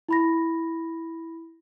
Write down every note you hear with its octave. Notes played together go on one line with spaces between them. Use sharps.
E4 B5 A#6